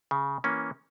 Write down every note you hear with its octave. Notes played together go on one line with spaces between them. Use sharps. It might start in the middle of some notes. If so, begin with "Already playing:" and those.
C#3
E3 A#3 C#4